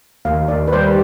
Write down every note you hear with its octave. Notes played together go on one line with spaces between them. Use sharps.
D#2 F5
D#2 D5
B4
G3 C5